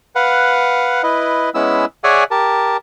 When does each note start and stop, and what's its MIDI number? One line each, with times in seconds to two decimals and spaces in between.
0.15 1.02 71
0.15 1.02 77
0.15 1.02 78
1.03 1.50 64
1.03 1.50 71
1.03 1.50 75
1.54 1.85 56
1.54 1.85 59
1.54 1.85 61
1.54 1.85 64
1.54 1.85 88
2.04 2.24 68
2.04 2.24 73
2.04 2.24 74
2.04 2.24 76
2.04 2.24 78
2.04 2.24 80
2.31 2.77 67
2.31 2.77 70
2.31 2.77 81